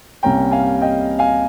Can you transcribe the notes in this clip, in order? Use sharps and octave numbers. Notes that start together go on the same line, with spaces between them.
C2 C3 G3 A#3 C#4 G5 A#5
F5 G#5
D#5 G5
F5 G#5